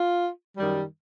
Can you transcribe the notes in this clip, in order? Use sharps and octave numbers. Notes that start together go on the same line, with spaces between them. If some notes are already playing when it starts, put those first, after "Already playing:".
Already playing: F4
F#2 D#3 G3